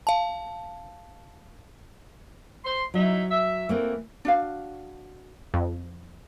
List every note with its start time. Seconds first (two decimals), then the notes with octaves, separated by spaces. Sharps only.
0.07 F5 A5
2.64 C5 C6
2.94 F#3 D#4 E4 E5
3.29 E5
3.69 E3 A3 A#3 C4
4.25 D4 F#4 F5
5.54 F2